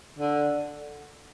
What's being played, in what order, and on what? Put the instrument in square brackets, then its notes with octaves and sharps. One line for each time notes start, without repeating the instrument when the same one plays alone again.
[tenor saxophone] D3